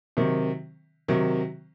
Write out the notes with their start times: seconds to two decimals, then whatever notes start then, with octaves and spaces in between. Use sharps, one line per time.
0.17 C3 D#3 F#3
1.08 C3 D#3 F#3